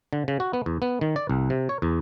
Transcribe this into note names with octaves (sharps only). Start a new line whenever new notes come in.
D3
C#3
F#4
B3
E2
B3
D#3
D5
C2
C3
C#5
E2